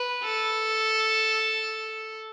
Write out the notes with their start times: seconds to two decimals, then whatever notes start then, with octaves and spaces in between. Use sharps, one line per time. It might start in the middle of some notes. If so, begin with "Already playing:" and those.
Already playing: B4
0.24 A4